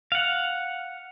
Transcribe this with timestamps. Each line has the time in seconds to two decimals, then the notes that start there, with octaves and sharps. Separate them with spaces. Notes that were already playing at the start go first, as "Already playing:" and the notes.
0.12 F5 F#5